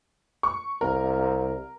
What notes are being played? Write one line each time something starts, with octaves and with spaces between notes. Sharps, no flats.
C#6
C2 A#4